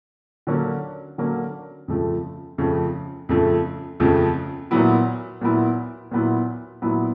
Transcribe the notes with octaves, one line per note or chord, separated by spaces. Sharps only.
D3 F#3 A#3 C#4
D3 F#3 A#3 C#4
F2 C#3 F3 A3
F2 C#3 F3 A3
F2 C#3 F3 A3
F2 C#3 F3 A3
A#2 F#3 B3 E4
A#2 F#3 B3 E4
A#2 F#3 B3 E4
A#2 F#3 B3 E4